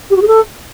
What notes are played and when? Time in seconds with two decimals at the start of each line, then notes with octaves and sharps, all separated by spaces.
0.10 G4
0.16 F#4
0.22 G#4
0.27 A4